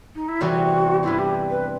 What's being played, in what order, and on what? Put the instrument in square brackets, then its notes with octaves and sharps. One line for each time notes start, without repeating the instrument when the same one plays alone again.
[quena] D#4
E4
[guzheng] E2 C3 E3 G3 C4 [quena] F#4
[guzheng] G2 E3 G3 C4 [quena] E4
[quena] G4
B4